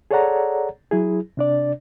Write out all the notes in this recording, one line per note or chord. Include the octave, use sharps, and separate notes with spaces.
G#4 A4 C#5 D5 F#5 A#5
F#3 E4 G#4
C3 D4 D5